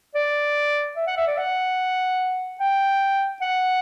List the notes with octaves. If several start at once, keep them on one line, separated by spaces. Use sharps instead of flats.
D5
E5
F#5
E5
D5
F#5
G5
F#5